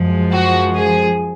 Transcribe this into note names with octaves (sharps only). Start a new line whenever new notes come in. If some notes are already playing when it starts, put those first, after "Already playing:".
Already playing: F#2 F3 G#3
F#4
G#4